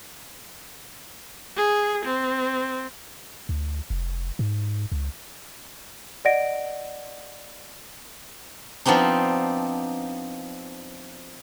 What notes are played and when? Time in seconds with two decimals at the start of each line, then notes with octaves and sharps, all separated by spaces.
1.57 G#4
2.05 C4
3.49 D2
3.90 F1
4.39 G#2
4.92 C#2
6.25 D5 D#5 F#5 A#6 D7
8.86 F3 B3 C4 D4 D#4